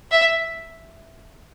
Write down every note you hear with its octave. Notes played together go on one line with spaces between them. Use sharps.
E5